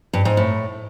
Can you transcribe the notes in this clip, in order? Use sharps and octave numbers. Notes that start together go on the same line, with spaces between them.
G2
G#2
A2